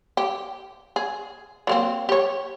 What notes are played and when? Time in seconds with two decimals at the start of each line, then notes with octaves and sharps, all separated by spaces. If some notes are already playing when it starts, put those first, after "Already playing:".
0.17 G4
0.96 G#4
1.67 F#3 A#3 C4
2.09 G4 C#5